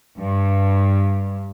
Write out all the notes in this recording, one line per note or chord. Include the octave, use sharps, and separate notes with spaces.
G2